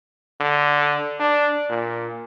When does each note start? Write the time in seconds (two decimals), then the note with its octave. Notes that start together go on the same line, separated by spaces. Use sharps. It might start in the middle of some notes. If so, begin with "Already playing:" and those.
0.40 D3
1.19 D4
1.69 A#2